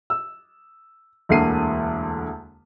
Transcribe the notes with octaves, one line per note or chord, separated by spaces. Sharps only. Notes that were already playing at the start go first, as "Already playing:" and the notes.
E6
E1 D2 D3 A#3 C7 D#7